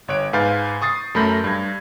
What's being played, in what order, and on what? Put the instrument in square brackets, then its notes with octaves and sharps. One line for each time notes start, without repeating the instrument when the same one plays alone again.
[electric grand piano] G1 C#5 F#6 D7
G#2 B4 F5 G#5 G6 A6
C#6 D#6 A6 C7
F#2 A3 A#4 B5 G6 A#6
G2 G#6